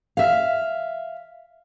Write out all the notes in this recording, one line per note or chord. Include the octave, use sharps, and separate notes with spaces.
E5 F5